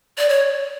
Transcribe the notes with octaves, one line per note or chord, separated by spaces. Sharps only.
D5
C#5